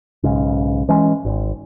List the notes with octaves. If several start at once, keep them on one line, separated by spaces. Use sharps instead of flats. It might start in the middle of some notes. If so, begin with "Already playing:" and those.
B1 G#2 C#3
E3 G#3 C#4
G#1